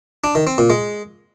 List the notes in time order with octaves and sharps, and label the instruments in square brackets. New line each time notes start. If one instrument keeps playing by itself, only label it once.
[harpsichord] D4
D#3
C4
A#2
G#3